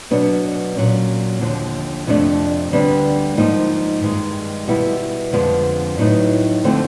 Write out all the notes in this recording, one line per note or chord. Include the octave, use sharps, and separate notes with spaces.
B2 F#3 B3 D4
A#2 F#3 A#3 C#4
D#2 D3 F3
F2 C3 F3 A3 D4
D2 D3 G3 B3 D4
G#2 F3 A#3 D#4
G2 D#3 G#3
B2 G3 B3 E4
F2 D3 F3 G#3 B3
A2 F#3 B3 D#4
D3 F3 A3 C4